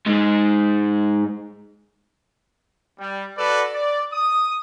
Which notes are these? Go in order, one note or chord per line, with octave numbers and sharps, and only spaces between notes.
G#2 G#3
G3
F#4 A4 B4 D5
D5
D#6